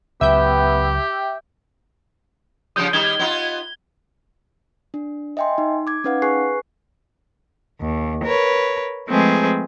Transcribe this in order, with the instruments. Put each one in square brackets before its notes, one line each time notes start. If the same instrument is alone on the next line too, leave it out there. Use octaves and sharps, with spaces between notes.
[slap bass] C#2 F#3 [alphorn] B3 [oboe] G4 [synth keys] E5 G5
[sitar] C#3 F3 G3 [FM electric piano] D#6 G6
[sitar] D#3 G3 D#4 [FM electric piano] G#6 [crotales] G7
[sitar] B3 D#4 F4
[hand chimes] D4
D#5 E5 G5 G#5 C6
D#4
D6 G#6
C#4 D#4 B4 F5 F#5
G#4 B4 G#5 C#6 F#6 C7
[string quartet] D#2
A#4 B4 C#5
F3 G#3 A3 C4 G#4 B4